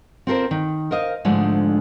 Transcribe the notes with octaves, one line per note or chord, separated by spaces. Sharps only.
C4 F4 A4 A#4 C5
D#3
A#4 C5 D#5 F5
G#2 D3 F3 G#3 A3 D4